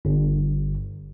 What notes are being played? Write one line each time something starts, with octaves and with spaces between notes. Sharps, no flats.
G1